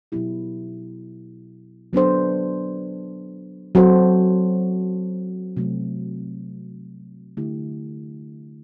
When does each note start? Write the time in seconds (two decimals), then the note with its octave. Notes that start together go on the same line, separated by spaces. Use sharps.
0.12 B2 F#3 B3 E4 G4
1.93 F#3 B3 D4 A4 C5
3.75 F#3 C4 F#4 A4 C5
5.57 C3 F#3 A3 C4
7.37 D3 A3 E4 G4